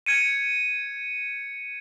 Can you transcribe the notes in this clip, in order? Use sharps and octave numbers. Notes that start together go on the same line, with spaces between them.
G#6 C#7 D#7